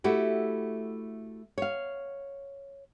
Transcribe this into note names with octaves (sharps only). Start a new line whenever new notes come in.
A3 E4 F#4 G4
C#5 F5